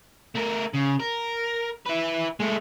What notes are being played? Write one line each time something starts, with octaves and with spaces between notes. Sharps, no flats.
A3 A#4
C#3
A#4
E4 B4
G#3 A3